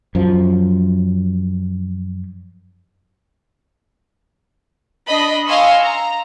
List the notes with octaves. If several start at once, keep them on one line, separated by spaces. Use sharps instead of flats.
F#2 F3
D4 D#5 B5
D#5 F5 G#5 C6 C#6 E6
A#5